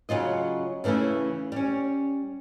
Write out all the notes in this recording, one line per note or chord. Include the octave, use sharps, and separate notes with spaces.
C#3 F#3 F4 D#5
C#3 E3 A3 C#4 E4
G3 C#4